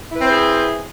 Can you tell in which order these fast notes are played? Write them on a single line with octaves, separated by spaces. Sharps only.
E4 B4 C4 C5 G#4